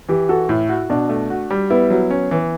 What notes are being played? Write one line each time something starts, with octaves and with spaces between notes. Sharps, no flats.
E3 G4
F#4 A4
A2 E4
F#4
B2 D4
A3
F#4
G3
B3 E4
F#3
C#4
E3